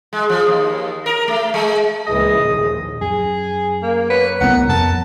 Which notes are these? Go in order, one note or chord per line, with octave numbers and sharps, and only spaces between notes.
G#3
F3
D#2
A#4
A3
G#3
C#2 A#2 E3 G#4 D#5
A#1 D#2 A#2
F#2 G#4
A#3
B4 C#5
D#1 C2 B3 A#4 F#5
F2 A5